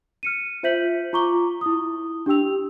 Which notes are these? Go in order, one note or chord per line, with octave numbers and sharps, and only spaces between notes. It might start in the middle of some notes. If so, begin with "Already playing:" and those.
F6 C#7 D#7
F4 C5 E5 G6 B6 F#7
F4 A#5 C#6 D6 G7
E4 D#6
D4 G4 G5 E6 F7